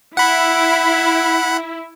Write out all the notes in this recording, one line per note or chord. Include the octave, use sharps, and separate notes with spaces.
E4 F#5 B5